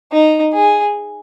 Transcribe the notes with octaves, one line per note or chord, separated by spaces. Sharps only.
D#4
G#4